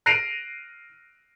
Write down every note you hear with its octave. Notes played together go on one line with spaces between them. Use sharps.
F#6 A#6 C7 D7 D#7 F7